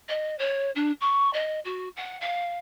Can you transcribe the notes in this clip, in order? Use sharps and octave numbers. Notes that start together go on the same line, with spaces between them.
D#5
C#5
D4
C#6
D#5
F#4
F#5
F5